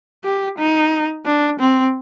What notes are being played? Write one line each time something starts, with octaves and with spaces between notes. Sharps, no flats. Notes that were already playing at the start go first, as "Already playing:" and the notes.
G4
D#4
D4
C4